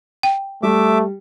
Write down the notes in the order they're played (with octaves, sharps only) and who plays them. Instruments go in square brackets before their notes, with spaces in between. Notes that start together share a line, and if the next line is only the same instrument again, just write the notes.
[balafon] G5
[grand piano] G3 [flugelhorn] A3 [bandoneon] E5 D6